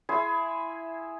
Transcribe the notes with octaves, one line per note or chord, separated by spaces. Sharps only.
E4 G#4 E5 C6